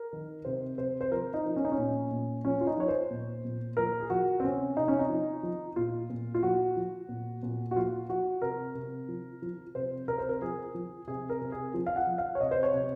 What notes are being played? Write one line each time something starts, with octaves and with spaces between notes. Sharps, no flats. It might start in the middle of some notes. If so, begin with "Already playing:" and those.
Already playing: A#4
D#3
C3 C5
C3 C5
C5
F3 A#4
D#4
F3
C#4
D#4
C#4
A#2
A#2
F3 C#4
F4
D#4
F3 C#5
C5
A#2
A#2
F3 A#4
G#4
F3 F#4
C4
C3 C#4
C3 D#4
C#4
D#4
F3
F3
A#2 F4
A#2
F4
F3 F#4
F3
A#2
A#2
F#4
F3 F4
F3 F#4
C3 A#4
C3
F3
F3
C3 C5
C3 A#4
C5
A#4
F3 G#4
F3
C3 G#4
A#4
C3
G#4
F3
F5
F#5
F3
F5
C#5
C3 D#5
C5
C#5
C3